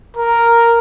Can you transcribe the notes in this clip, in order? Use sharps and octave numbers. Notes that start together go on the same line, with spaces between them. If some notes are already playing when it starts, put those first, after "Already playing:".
A#4